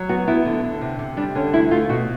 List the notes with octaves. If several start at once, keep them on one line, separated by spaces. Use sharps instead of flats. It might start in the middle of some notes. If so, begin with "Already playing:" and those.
Already playing: F#3
B3 F#4
B3 E4
D3
D3
C3
C3
G3 D4
D3 C#4
D2 E4
A3 F4
B2 F#4